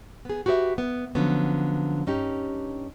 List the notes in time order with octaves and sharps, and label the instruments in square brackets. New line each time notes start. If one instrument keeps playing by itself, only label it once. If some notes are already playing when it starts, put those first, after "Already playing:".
[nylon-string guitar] B3 G#4
F#4 G4 B4 D5 E5
B3
D3 F3 F#3 B3 C#4
G2 C#4 D#4 G4